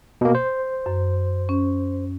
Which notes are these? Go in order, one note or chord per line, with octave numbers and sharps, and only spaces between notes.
B2 A#3
C5
F#2
C#4